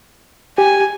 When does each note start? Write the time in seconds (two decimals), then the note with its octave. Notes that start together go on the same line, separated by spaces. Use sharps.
0.58 G4 G#5